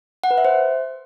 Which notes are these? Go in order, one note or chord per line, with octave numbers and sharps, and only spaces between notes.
F#5
B4
E5
C5